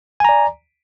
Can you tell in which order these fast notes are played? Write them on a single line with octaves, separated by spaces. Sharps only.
G#5 A#5 D5